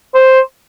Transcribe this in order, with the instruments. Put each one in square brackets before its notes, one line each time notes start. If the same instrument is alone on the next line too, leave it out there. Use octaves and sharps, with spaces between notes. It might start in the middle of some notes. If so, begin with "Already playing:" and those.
[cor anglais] C5